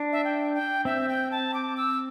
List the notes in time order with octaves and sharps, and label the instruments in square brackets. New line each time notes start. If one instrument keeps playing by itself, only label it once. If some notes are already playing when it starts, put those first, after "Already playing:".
Already playing: [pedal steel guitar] D4
[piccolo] E5
G5
G5
[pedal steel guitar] C4 [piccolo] E5
[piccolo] G5
A5
D6
E6